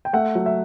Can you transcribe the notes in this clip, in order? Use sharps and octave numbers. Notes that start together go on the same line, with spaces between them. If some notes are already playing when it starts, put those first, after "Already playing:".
G5
A3 F#5
F#3
E5